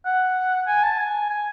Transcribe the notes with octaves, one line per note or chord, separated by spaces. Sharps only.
F#5
G#5
A5
G#5
G#5